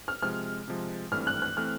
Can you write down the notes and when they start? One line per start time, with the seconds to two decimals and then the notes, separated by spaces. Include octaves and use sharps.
0.08 F6
0.22 C3 F3 G#3 F6
0.68 C3 F3 G#3
1.12 G#1 G2 E3 A3 C4 F6
1.27 F#6
1.42 F#6
1.57 E3 A3 C4 F6